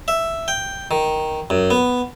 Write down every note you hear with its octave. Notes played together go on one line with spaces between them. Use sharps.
E5
G5
D#3
F#2
B3